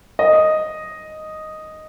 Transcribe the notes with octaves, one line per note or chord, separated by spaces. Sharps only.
D#5